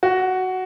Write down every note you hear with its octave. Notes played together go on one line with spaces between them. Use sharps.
F#4